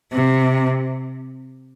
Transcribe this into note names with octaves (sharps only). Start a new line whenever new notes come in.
C3